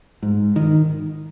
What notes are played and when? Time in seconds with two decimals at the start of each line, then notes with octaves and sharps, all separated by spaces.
0.23 G#2
0.56 D#3